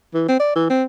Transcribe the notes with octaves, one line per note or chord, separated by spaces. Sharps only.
E3
C4
D5
E3
C4